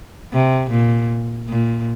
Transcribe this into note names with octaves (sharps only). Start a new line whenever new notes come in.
C3
A#2
A#2